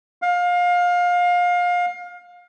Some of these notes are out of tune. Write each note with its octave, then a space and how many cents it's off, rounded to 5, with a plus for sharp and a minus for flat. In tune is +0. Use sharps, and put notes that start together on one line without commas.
F5 +25